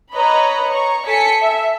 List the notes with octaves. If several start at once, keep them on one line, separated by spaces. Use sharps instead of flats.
B4 C#5 D#5 A#5 B5
C#5 A#5 C#6
A4 G#5 B6 C#7
E5